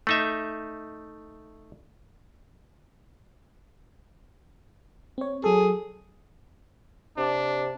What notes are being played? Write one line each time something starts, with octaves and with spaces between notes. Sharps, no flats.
A3 D#4 E5
C4 C#5
F#3 G#4 A4
C3 D4